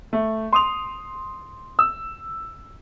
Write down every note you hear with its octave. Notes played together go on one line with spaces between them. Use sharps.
A3
C6 D#6 F7
E6